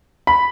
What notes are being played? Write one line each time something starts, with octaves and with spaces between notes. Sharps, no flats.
B5